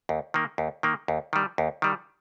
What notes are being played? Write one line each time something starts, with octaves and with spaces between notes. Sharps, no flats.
D#2
D#3 A#3
D#2
D#3 A#3
D#2
D#3 G3
D#2
D#3 G3